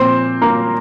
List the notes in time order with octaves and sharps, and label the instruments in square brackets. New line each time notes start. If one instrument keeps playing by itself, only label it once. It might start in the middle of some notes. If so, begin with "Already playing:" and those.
Already playing: [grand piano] A#2 F3 C4 C5
A#3 A#4